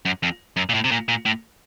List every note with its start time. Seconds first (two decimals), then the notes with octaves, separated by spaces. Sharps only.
0.05 F#2
0.23 F2
0.57 F#2
0.69 A#2
0.74 A2
0.84 C3
0.91 A#2
1.08 A#2
1.26 A2